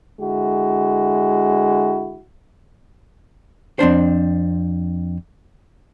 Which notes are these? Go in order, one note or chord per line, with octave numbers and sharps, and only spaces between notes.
D3 G#3 E4 F#4
F2 C4 D4 C5